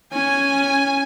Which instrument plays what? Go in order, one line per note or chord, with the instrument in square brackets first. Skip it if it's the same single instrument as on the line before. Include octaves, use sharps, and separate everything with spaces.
[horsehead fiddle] C#4 [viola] G#5